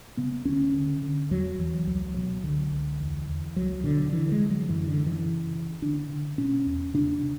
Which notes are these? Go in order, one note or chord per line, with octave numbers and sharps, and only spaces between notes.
C#3 B3
D2 C#4
D3
D3
E2 F#3
E2 E3
C#2 F#3
B2 F#3
C#2 D3
C#2
E2
E2
C#2 F#3
B2 D3
D3 E3
G#3
D3
F#3
F#2 E3
D3
C#3
E3
C#3
C#3
D3 D4
D3
B2 C#4
E2
C#3 D4
C#3